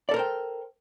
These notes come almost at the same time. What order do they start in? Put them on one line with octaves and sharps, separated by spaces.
D5 A4 A#4 C5 G5